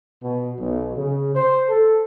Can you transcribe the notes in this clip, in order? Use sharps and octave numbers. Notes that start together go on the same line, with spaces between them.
B2
B1
C#3
C5
A4